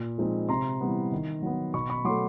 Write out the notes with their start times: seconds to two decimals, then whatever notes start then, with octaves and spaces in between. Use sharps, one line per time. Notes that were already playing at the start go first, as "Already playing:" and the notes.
Already playing: A#2 B5
0.18 F3 G#3 C4 D#4
0.49 C3 A#5 C6
0.81 E3 G3 B3
1.12 D#3
1.42 F#3 B3
1.74 B2 B5 C#6
1.89 B5 C#6
2.05 F#3 A3 C6 D6